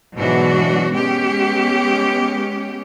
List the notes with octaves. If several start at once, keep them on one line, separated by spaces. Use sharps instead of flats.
G#2 B2 E3 F#3 D4 F#4
G#3 B3 C#4 G4